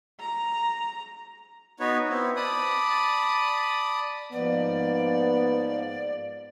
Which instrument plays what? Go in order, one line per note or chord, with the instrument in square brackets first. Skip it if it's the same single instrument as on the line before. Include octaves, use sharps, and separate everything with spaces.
[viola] A#5
[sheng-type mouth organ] B3 D#4 F#4 B4 C#5
B3 C4 E4
D5 A5 B5 D#6
[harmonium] G#2 F3 A#3 [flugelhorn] B3 [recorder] D5